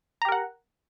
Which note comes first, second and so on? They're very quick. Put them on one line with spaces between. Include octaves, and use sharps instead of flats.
A#5 G4 A#4 F#5